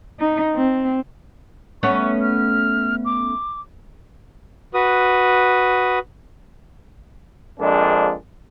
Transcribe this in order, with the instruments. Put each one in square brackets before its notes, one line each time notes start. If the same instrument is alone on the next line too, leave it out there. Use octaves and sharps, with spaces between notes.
[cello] D#4
C4
[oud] A3 B3 C#4 [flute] C#6
[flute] F6
D6
[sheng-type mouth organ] F#4 B4 D#6
[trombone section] A#1 F2 G#3 A#3 D4